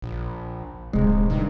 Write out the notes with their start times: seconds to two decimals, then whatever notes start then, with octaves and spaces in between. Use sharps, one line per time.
0.02 A#1
0.93 D1 C3 G#3
1.30 G2 D#3